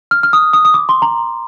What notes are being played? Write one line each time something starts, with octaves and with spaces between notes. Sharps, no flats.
F6
F6
D#6
D#6
D#6
D6
C6
A#5